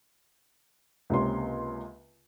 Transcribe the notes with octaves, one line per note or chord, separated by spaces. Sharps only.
C#2 C3 A#3 C#4 C6